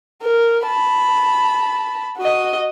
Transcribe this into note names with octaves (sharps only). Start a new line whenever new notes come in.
A#4
A5 B5
F#4 D#5